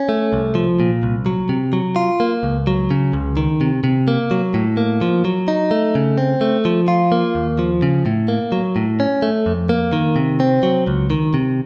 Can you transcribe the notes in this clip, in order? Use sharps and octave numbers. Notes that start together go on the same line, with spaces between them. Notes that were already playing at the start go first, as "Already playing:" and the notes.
Already playing: C#4
A3
C2
F3
A#2
C2
F#3
C3
F#3
F4
A#3
C#2
F#3
C#3
C#2
D#3
C3
C3
A#3
F#3
A2
A#3
F3
F#3
D#4
A3
C#3
C4
A3
F3
F4
A#3
D#2
F3
C#3
A2
A#3
F#3
A2
C#4
A3
F2
A#3
D#3
C3
C4
F#3
C#2
D#3
C3